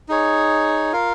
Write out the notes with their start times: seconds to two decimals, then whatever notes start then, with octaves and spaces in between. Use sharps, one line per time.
0.09 D#4 G#4 C#5
0.92 F4 A#4 F5